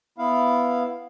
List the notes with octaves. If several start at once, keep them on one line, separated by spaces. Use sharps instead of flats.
B3 E4 F5